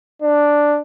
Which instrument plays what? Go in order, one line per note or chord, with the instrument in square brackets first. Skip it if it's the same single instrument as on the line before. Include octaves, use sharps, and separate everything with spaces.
[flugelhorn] D4